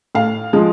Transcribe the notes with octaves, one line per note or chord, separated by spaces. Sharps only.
A2 F5
F3 G#3